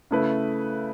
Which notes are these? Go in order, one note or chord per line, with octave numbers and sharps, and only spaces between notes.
C#3 A3 E4 B4